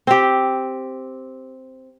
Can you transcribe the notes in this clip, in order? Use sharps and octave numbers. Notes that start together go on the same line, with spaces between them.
C4 G4